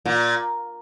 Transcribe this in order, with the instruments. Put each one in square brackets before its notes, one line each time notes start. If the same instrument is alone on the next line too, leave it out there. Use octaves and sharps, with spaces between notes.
[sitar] A#2